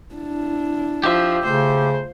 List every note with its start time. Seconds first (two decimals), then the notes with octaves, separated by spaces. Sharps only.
0.15 D4 E4
1.04 F3 G4 E5
1.45 C#3 A3 C5